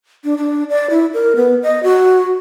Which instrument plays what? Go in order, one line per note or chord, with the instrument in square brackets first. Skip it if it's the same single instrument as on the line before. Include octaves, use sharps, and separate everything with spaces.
[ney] D4
D4
D5
E4
A#4
B3
D#5
F#4